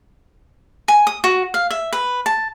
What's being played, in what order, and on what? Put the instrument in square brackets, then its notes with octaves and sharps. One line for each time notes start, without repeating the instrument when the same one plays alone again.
[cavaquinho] G#5
D#6
F#4
F5
E5
B4
A5